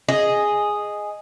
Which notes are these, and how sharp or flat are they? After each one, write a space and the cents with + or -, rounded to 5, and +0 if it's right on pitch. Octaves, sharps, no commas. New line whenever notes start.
G#4 +0 D#5 -5